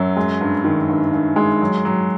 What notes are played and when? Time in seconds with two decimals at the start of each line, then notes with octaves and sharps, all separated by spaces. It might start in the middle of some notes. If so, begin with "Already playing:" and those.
Already playing: F#2 F#3
0.16 G#3
0.41 G2
0.64 D#3
0.89 G2
1.13 G2
1.36 G#3
1.61 F#3
1.85 F#3